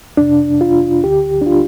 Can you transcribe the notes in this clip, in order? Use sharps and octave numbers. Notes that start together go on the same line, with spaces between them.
F2 C3 D4
F4
D2 D3 G4
D4
F4